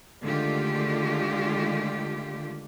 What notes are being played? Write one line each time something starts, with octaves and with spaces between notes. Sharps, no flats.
D3 D#3 G#3 A3 F4 G4